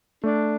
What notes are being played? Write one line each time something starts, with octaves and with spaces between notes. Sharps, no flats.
A3 D4